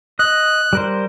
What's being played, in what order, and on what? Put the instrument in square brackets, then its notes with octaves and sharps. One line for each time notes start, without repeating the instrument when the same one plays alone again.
[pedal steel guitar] D#5 [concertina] F#6
[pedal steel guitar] G3 A#4 C5